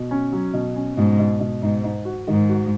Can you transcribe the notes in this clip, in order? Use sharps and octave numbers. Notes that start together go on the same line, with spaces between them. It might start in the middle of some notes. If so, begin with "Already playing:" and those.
Already playing: B2
C#4
F#3
B2
C#4
G#2 B2
B2
B2
G#2 D#4
D#4
F#4
G#2 D#3
F#4